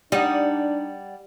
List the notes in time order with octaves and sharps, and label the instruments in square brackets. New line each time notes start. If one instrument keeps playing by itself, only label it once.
[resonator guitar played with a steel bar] G3 [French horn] D4 [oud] D#4 [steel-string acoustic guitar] D5 F#5